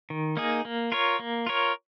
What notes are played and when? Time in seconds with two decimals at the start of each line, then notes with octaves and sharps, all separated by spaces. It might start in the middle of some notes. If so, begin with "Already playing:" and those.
0.10 D#3
0.37 A#3 D#4 G#4
0.65 A#3
0.92 F4 A#4 C#5
1.19 A#3
1.47 F4 A#4 C#5